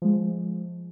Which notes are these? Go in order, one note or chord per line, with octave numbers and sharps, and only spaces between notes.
F3 G#3